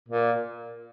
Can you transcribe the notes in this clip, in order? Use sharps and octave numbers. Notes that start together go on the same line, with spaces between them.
A#2